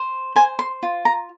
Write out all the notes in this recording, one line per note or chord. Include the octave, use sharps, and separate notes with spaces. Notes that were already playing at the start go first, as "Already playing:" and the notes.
Already playing: C5
C5 G#5
C6
F4
A#5